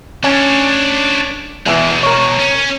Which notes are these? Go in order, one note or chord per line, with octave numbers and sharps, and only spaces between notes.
C#4 D4 C#5
E2 B2 E3 G#3
A#4 C#5
C#4